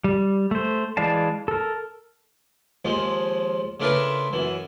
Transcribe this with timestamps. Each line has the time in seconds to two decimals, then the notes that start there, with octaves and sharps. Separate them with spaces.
0.04 G3
0.51 A3 C5
0.97 E3 G#3 D5 F5 A5
1.48 A4 A#4
2.85 D#2 F3 G#3
3.80 C#3 A3 D4 F4 A#4 B4
4.33 F#2 E3